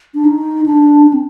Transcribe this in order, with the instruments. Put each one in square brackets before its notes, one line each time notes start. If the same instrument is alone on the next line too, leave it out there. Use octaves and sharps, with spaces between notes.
[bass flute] D4
D#4
D4
D4
C4